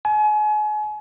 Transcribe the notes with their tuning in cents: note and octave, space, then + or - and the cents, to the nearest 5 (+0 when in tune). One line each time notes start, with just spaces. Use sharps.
G#5 +35